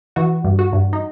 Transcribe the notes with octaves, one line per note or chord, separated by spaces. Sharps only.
E3 F#4
G2
F#4
G2
D#4